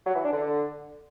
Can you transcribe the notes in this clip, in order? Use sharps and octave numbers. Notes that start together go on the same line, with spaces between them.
F#3
E3
D4
D3